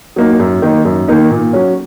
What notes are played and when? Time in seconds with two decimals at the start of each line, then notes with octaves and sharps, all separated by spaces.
0.16 F#3 A#3 D#4
0.39 F#2
0.62 D#3 A#3 D#4
0.85 F#2
1.08 D#3 A#3 D#4
1.30 A#2
1.53 F#3 C#4